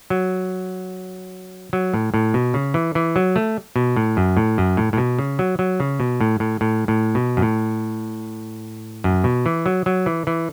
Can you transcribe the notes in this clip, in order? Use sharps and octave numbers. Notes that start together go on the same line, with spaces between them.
F#3
F#3
A2
A2
B2
C#3
E3
E3
F#3
A3
B2
A2
F#2
A2
F#2
A2
A2
B2
C#3
F#3
F#3
C#3
B2
A2
A2
A2
A2
B2
F#2
A2
F#2
B2
E3
F#3
F#3
E3
E3